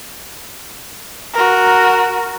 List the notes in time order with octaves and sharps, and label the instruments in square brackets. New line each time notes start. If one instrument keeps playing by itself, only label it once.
[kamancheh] F#4 A#4